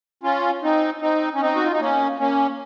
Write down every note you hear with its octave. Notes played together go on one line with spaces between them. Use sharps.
C#4 F4
C4 D#4
C4 D#4
C#4
C4 D#4
F#4
F4
D#4
A#3 C#4
A#3 C#4